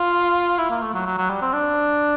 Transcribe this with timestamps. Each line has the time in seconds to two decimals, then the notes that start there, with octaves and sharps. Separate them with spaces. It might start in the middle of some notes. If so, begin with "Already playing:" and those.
Already playing: F4
0.58 E4
0.70 A#3
0.82 A3
0.94 F#3
1.06 F#3
1.17 F#3
1.30 G3
1.42 C4
1.53 D4